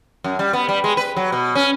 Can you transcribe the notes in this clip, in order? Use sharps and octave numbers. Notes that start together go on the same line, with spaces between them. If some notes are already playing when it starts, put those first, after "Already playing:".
F#2
G3
B3
G3
G#3
B4
F#3
B2
C#4